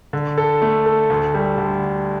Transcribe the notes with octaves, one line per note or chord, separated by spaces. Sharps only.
D3
A4
A3
A4
D2
G3
D3